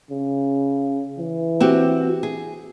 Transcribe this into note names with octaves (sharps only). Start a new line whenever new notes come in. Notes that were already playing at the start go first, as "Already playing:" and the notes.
C#3
E3
C4 F#4 G4
G#4